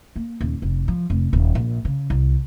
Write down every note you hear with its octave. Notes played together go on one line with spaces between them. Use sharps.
A#3
D#1
F1
F3
F1
D#1
A#1
C#3
C2